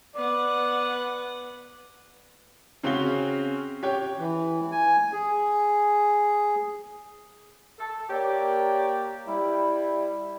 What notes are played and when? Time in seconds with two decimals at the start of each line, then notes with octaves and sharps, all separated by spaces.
0.15 B3 D5 F#5
2.83 C#3 C4 C#4 F#4 F5 G7
3.83 G4 C#5 G5
4.19 E3
4.72 G#5
5.13 G#4
7.79 A4
8.10 A#3 G4 C#5 D5
9.27 G3 E4